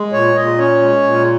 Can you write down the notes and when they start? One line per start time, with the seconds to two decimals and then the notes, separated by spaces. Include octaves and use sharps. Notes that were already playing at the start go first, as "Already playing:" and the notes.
Already playing: G#3
0.12 A#2 C#5
0.35 A#2 D#5
0.58 C#4 C#5
0.81 G#3
1.03 A#2